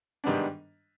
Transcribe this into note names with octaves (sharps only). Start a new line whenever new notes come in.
G#2 D#3 G3 B3 D4